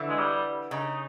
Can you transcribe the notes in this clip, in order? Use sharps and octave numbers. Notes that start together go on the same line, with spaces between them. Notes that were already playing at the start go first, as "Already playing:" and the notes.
Already playing: D3 E3
G#3
G3
C#3 D#4